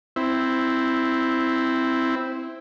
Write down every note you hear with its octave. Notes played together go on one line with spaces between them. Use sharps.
C4 E4